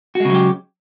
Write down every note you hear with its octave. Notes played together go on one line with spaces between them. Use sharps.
C#3 F#3 G#3 F#4 G4